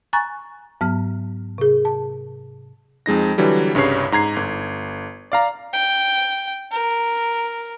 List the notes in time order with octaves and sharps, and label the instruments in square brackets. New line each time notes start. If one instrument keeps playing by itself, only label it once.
[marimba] G#5 A#5 C#6 F#6 A6
G#2 F#3 B3 F6
C3 G#4
A5
[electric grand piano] F2 G#3 D#4 A#6
D3 E3 F#3 G3
C2 G2 C#3 C#5 C7
G#2 A#5 G#6 C7
G1
D5 F5 A#5
[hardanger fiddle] G5
A#4